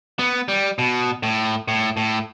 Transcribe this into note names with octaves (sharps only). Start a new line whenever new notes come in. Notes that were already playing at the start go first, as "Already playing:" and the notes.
B3
G3
B2
A2
A2
A2